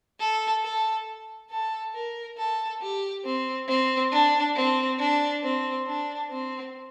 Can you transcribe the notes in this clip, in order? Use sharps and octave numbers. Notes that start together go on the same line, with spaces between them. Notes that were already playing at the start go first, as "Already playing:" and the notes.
A4
A4
A4
A#4
A4
G4
C4
C4
D4
C4
D4
C4
D4
C4